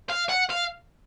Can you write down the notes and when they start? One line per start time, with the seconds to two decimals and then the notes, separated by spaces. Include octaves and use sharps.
0.09 F5
0.29 F#5
0.50 F5